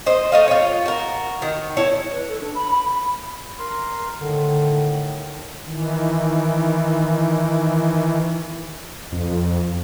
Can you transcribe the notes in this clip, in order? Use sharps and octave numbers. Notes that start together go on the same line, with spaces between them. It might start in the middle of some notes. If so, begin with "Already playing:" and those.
C5 D#5
A3 D#5 F5
F4 C#5
F#4 A#4
D#3
E4 C#5 A5
B4
A4
D4
B5
B5
B5
A#4 C6
A2 D3 D#3
D#3 E3
F2